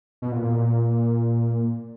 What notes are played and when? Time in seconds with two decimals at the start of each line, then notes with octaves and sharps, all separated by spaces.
0.22 B2
0.32 A#2
0.42 A#2